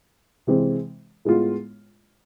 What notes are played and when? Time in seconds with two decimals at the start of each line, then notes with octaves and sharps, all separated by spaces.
0.47 C3 E3 G#3 C4
1.25 A2 G#3 B3 F4